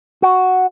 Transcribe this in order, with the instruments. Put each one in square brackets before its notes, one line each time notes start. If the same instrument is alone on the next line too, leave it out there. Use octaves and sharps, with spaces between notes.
[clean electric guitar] F#4